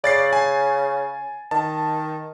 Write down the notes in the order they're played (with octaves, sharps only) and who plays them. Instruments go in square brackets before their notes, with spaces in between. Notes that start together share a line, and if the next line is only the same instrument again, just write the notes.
[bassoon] C#3 [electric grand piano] D5 A6 C7
[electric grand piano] G#5
[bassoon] D#3 [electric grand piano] A5